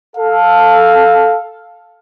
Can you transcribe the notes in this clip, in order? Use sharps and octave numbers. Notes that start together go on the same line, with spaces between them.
A4 F5